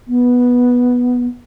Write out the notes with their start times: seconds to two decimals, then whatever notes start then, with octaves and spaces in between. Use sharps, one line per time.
0.07 B3